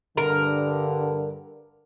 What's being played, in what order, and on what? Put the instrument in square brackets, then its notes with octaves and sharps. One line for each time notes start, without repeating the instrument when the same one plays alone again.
[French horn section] G2 D3 [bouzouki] A#4